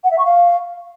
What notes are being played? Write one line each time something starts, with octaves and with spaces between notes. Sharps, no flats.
F#5
E5
C#6
F5